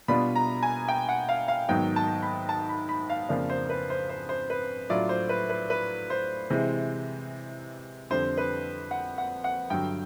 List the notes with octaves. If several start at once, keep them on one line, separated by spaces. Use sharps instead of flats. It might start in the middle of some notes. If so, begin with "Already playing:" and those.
B2 G3 B3 D4 F4 B5
A#5
G#5
G5
F#5
F5
F5
G#2 D#3 F#3 B3 D#4 G5
A5
B5
A5
B5
B5
F5
F2 C#3 F3 A#3 D4 F5
C5
B4
C5
C5
C5
B4
A2 F#3 A3 D4 F4 D5
C5
B4
B4
B4
C5
C3 E3 G#3
F2 D3 G3 C5
B4
F#5
F#5
F#5
G2 D3 F#3 G5